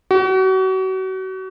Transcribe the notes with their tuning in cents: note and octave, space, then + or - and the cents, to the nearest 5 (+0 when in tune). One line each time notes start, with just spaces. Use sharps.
F#4 +35